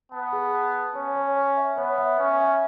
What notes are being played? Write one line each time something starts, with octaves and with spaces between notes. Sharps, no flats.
B3 A5
G#4
A5
A5
C#4 C#5
C#5
C#5
E5
B3 C#5
E5
C#4 E5
E5